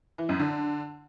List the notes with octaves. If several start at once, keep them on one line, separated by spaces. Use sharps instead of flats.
E3
F#2
D3